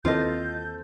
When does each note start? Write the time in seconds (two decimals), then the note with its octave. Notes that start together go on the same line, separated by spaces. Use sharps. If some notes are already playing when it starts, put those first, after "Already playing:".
0.05 D#2 E3 C4 F4 A4 D#5 G6